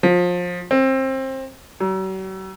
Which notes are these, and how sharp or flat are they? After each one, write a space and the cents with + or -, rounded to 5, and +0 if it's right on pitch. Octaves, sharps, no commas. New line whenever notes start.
F3 +25
C4 +25
F#3 +45